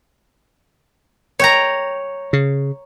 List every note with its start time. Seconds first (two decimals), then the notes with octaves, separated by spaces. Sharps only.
1.39 C#5 G5 A#5
2.33 C#3